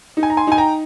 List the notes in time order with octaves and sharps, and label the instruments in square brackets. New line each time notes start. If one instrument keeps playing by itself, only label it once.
[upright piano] D#4
[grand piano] G#5
A#5
G#5 C6
[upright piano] D#4 [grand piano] G#5
[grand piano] G5 A#5